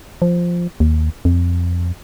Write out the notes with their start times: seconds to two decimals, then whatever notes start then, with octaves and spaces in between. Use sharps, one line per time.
0.22 F3
0.80 D#2
1.25 F2